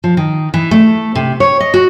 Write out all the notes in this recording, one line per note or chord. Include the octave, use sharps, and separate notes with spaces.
F3
D#3
E3
A3
C3
C#5
D#5
F#4